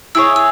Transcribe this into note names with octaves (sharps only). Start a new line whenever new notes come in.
E4 G#4 C#5 E6
E6